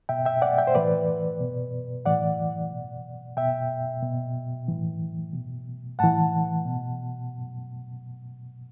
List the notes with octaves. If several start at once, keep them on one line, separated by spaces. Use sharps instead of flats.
B2 E5 G5
E5 G5
D5 F#5
E5 G5
C5
A2 E3 B4 D5
B2
A2 E3 D5 F#5
B2
B2 E5 G5
B2
A2 E3
B2
A2 E3 F#5 A5
B2